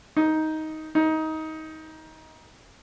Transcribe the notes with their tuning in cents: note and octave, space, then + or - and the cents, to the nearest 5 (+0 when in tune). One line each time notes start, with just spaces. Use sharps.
D#4 +10
D#4 +20